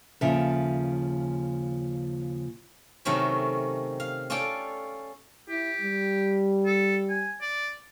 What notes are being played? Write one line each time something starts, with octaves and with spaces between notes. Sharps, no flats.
D#2 C#3 F3 A4 E5
C3 D#3 F#3 A3 C4 C#4
F5
C#4 F4 A4 D5 G5 A5
E4 G4
G3
A4
G#5
D5